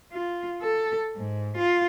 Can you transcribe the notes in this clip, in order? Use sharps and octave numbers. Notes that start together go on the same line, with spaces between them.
F4
A4
G#2
F4